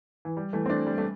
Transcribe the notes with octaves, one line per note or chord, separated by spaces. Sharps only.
E3
G3
E3 A3
C4
A3 D4
G3
A3